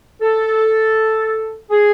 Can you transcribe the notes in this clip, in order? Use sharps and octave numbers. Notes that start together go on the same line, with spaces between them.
A4
G#4